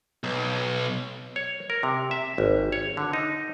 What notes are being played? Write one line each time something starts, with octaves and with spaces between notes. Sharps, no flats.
B1
C#5
A#4
C3
E5
G#1
C#5
D3
D#4